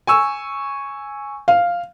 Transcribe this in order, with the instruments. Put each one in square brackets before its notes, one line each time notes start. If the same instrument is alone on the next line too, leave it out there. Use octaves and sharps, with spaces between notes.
[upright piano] G#5 C#6 E6
[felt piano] F5